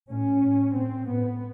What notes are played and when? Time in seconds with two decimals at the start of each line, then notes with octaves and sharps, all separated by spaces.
0.09 A2 C#4
0.42 A2
0.76 A2 C4
1.08 A2 B3